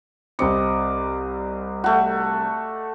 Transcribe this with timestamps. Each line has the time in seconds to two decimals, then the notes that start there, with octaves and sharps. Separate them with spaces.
0.39 C2 C4 D5 D#5 C#7
1.84 A3 F#4